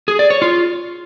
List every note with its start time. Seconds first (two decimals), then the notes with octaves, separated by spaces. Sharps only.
0.08 G#4
0.19 D5
0.30 C#5
0.42 F4